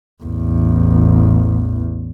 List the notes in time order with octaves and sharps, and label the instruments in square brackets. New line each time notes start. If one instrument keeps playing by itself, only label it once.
[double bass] A1 E2